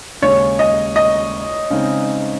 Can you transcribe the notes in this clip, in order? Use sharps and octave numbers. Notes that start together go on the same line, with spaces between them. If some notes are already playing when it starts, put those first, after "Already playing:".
D#2 C#3 G#3 C#4 C#5
D#5
D#5
C#3 G#3 C4 D#4